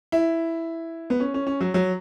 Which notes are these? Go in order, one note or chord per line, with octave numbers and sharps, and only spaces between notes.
E4
B3
C#4
C#4
C#4
F#3
F#3